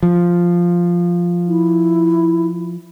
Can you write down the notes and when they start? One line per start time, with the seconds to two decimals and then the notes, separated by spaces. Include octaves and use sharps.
0.03 F3
1.48 E4